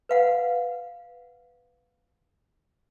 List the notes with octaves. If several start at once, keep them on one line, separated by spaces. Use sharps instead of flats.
B4 F5 F#5